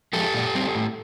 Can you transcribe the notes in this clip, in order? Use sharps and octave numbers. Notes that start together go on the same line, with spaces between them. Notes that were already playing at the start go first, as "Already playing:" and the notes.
F3 G#3 G4 A4
A#2
G3 C4
A2